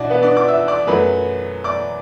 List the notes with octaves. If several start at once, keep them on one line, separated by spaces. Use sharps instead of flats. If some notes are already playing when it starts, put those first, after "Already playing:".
Already playing: B2 D4 E4 F#4 D5
B3 B4
D4 D5
D5 D6
E5 E6
D5 D6
F#2 F#3 A3 B4 B5
D5 D6